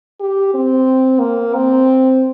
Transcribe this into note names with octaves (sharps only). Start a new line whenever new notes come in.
G4
C4
A#3
C4